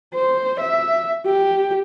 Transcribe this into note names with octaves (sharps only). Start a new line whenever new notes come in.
C5
E5
G4